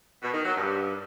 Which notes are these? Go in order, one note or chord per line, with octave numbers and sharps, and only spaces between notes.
B2
D#3
F#3
G2